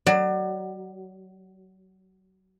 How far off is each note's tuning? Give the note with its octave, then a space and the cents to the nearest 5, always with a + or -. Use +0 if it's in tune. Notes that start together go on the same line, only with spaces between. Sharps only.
F#3 +25 D5 +30